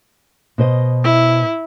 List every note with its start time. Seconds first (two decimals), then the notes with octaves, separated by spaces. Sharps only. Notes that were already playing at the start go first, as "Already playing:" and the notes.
0.58 B2 C5 D#5
1.04 E4